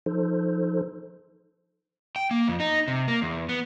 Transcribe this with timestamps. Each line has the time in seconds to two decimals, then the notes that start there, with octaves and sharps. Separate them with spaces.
0.06 F3 D#4 A4 C5
2.16 G5
2.31 A#3
2.48 F2
2.60 D#4
2.88 C3
3.08 A#3
3.22 E2
3.49 B3